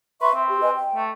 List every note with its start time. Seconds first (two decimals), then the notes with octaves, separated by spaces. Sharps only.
0.21 B4 E5 C6 C#6
0.34 C4 E5
0.49 G4
0.61 B4 D#5 G#5
0.75 G5
0.96 A3